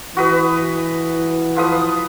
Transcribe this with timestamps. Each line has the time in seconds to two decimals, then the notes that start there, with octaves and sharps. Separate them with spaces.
0.17 E3 F#4 B4 D#6
1.56 F3 B4 D#6